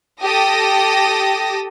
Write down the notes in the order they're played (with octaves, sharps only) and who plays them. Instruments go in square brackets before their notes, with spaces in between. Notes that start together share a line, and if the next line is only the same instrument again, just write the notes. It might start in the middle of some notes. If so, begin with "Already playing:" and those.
[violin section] G4 A4 D#6 A#6